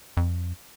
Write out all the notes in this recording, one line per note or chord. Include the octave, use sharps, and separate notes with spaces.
F2